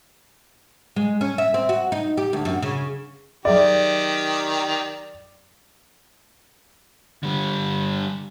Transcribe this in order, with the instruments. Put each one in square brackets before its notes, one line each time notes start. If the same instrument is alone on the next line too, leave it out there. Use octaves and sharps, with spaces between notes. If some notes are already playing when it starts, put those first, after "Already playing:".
[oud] G#3
C#4
E5
C4
F#4
D#4
G4
D2
F#2
C#3
[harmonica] D#3 G4 [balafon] F#3 G#4 E5 [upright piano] D5
[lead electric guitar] D3 G3